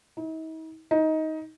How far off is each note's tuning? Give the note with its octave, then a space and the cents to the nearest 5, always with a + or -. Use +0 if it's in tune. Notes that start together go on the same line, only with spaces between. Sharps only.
D#4 +45
D#4 +15